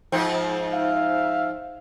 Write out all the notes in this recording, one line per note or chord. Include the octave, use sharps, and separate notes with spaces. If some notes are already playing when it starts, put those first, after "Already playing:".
G#2 F3 C4
E5 F5